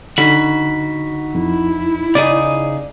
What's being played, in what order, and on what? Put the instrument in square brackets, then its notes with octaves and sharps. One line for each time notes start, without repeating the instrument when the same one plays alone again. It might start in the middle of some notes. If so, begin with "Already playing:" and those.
[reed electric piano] D3 [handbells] D#4 B6 [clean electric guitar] F#4 B5
[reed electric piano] F2 [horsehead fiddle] E4
[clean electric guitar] C#3 D#4 G#4 [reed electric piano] D5